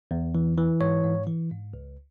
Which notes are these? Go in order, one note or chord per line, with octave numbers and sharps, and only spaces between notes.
E2
E3
E3
G#2 C#5
G#2
E3
G#2
C#2